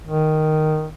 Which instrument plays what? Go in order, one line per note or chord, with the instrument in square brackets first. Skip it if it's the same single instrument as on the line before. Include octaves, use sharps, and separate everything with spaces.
[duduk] D#3